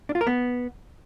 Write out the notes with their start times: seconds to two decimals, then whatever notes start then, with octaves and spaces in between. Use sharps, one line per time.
0.09 D4
0.15 F4
0.21 A#4
0.27 B3